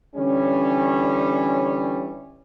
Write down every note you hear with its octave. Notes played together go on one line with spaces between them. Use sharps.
D3 E3 G3 C#4